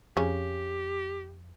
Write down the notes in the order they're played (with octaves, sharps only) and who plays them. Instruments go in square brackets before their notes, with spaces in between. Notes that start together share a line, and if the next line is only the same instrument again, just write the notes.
[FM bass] F2 [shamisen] C#3 C#4 [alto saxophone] G4